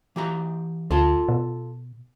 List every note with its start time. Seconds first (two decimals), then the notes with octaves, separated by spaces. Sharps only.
0.16 E3 G4 A#5
0.91 D2 F4 A4 A5
1.28 B2